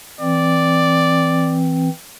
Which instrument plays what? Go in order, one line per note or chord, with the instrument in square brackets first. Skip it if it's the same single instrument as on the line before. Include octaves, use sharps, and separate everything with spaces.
[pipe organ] E3 C4 [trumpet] D5